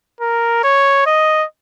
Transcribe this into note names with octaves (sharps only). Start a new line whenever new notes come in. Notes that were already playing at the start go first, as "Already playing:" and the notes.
A#4
C#5
D#5